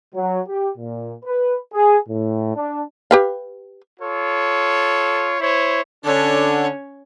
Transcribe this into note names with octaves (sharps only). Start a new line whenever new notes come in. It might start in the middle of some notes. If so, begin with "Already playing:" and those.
F#3
G4
A#2
B4
G#4
A2
D4
G4 B4 F5
F4 A4 C#5
E4 C5 C#5
D3 C#4 D4 C#5